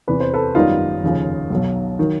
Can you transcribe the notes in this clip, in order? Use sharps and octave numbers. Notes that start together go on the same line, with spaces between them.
E2 C3 E3 B4
C5
A4 B4
G#1 F#2 D#3 G3 B3 D#4 F4
F1 D#2 C#3 F3
B1 B2 F#3
D#3 F#3